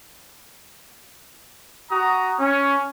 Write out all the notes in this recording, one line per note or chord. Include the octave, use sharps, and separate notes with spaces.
F#4 A#5 D#6
C#4